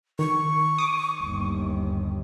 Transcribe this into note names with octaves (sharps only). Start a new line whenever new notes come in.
D#3 C#6
D6 D#6
G1 D#2